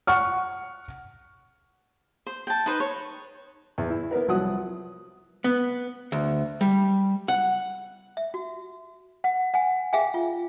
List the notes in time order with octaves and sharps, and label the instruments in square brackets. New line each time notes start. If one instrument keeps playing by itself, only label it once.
[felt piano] F#5 C#6 F6
[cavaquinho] C5
G5 A5
D#4 B4 C5
C#5
[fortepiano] E2
E4
B3 E4 A#4 B4
C2 F3 F#3 F#5 D#6
[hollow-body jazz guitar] B3
D2
G3
F#5
[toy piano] E5
F#4
F#5
F#5 G#5
G#4 E5 F5 G5 G#5
F4